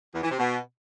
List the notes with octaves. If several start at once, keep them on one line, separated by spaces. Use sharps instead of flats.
E2
E3
C3
B2